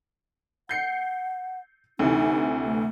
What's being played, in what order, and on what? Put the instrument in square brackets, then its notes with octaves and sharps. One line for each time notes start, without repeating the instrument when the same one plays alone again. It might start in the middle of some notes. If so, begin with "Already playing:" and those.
[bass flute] F#5 [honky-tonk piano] G6 C7 C#7
[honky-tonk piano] D2 C3 E3 [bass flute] D#4
[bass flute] A3